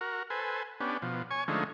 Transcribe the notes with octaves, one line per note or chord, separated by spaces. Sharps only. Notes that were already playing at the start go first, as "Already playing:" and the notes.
F#4 A#4
A4 B4 C5 G#5
B3 C#4 D4 G4
B2 F3
C#5 G#5 C#6
D3 F3 G#3 A3 C#4 D#4